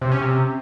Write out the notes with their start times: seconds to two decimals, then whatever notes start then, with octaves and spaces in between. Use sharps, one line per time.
0.02 C3
0.12 C#4
0.22 C3